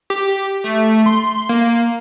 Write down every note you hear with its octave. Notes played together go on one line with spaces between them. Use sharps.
G4
A3
C6
A#3